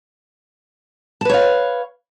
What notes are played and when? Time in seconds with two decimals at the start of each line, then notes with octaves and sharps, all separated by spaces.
1.21 A5
1.25 B4
1.29 C#5
1.34 F5